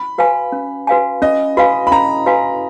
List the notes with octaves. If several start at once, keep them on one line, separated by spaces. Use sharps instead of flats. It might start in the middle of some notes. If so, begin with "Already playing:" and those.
Already playing: B5
F#4 B4 F5 G#5
C#4
F#4 B4 F5 G#5
C#4 D#5
F#4 B4 F5 G#5 B5
B5
C#4 A#5
F#4 B4 F5 G#5